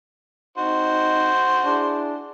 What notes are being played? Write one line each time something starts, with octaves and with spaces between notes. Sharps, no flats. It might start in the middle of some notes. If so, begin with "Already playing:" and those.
C4 D#4 F#4 C5
D4 E4 G#4